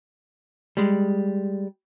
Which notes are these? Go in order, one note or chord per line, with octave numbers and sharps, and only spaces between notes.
G3 G#3